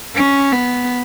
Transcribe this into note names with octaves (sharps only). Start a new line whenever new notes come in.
C#4
B3